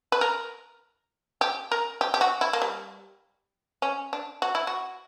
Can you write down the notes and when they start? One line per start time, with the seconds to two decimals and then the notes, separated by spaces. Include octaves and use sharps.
0.12 B4
0.21 A#4
1.41 G4
1.72 A#4
2.01 G4
2.14 G4
2.21 F#4
2.41 E4
2.53 A#3
2.62 G3
3.82 C#4
4.13 D4
4.42 F#4
4.55 E4
4.67 F#4